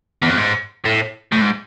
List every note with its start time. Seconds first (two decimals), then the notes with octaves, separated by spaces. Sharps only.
0.23 E2
0.30 F2
0.38 G#2
0.85 A2
1.32 A2
1.41 G#2